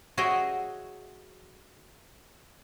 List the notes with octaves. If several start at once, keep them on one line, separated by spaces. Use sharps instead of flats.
F#4 G#4 C#5 D#5 E5 G5